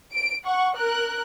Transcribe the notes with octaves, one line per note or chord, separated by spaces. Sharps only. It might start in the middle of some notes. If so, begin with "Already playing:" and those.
D7
F#5 C#6
A#4 F#6